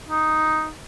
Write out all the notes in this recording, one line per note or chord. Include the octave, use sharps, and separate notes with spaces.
D#4